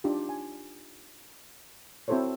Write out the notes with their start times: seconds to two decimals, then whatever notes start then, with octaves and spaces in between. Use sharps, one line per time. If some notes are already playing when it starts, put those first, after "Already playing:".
0.04 D4 D#4 F4 G4
0.29 G#5
2.08 C4 E4 F#4 A4 C5 C#5